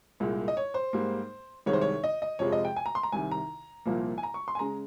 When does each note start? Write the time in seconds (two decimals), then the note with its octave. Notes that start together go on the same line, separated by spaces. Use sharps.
0.20 C2 A#2 G#3
0.48 D#5
0.57 C#5
0.74 C5
0.93 G#2 G3 A#3
1.66 C2 C3 D#3 G#3 C#5
1.73 C5
1.81 C#5
2.04 D#5
2.22 D#5
2.39 F2 C3 F3 G#3 C#5
2.52 D#5
2.65 G5
2.76 G#5
2.86 A#5
2.95 C6
3.03 A#5
3.12 C2 C3 D#3 G#5
3.31 A#5
3.85 C2 A#2 F3 A#3
4.18 G#5
4.23 A#5
4.34 C#6
4.48 C6
4.55 G#5
4.59 C#3 G#3 A#5